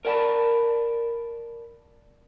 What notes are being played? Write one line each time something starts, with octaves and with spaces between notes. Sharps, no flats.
A#4 D5 F#5 G5 A5 B5